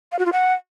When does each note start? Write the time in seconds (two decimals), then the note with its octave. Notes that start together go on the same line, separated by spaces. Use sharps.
0.12 F5
0.19 F#4
0.26 F4
0.33 F#5